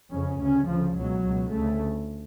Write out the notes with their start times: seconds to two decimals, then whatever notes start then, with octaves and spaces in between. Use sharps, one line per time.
0.10 F2 C#3 C#4
0.38 D2 C#3 C#4
0.67 D2 C#3 F3
0.96 C#2 B2 F#3
1.24 C#2 B2
1.53 D2 C#3 A3